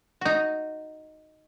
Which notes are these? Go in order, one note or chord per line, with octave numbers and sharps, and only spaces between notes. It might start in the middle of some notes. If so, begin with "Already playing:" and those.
D#4 F#4